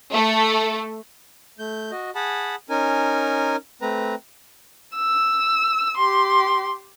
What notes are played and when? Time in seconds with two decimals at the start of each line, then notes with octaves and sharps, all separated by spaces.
0.13 A3
1.59 A3 G6
1.91 F#4 D#5
2.15 G#4 F#5 A5 B5
2.70 C#4 D#4 A#4 G#5
3.82 A3 C4 B4 A#5
4.95 E6
5.97 G4 C6